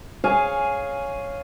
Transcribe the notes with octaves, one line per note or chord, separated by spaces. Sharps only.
G#4 C#5 F5 G#5